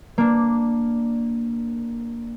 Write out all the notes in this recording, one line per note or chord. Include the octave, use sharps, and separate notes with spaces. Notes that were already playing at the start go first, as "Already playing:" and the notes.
A#3 D4